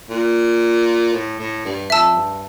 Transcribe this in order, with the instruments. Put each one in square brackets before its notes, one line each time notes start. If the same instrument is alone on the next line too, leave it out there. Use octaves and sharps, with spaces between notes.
[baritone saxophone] A#2
A2
A2
G2
[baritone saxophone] F2 [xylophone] E5 A5 E6
[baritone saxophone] G2